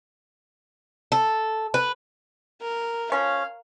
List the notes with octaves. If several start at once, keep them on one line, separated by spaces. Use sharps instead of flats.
A4
B4
A#4
F3 C#4 F5